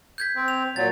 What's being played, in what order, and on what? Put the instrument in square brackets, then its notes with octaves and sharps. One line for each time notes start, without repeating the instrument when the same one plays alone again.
[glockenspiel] G6 G#6 B6
[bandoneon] C4
[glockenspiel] F7
[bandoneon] A#2 F#3 [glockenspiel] A6